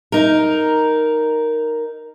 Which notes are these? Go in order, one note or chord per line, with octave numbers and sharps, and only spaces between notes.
D#4 A#4